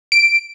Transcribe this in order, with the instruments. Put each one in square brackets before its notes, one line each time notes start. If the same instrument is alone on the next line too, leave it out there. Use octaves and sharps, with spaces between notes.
[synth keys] D7